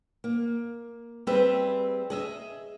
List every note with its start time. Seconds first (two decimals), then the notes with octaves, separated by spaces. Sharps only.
0.24 A#3
1.27 G3 C4 G#4 B4 E5
2.10 G#4 D#5 E5